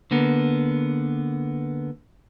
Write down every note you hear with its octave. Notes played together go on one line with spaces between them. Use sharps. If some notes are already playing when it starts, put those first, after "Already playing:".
D3 A#3 B3